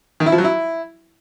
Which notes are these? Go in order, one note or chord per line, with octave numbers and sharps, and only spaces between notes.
D#3
E4
F3
F#3
E4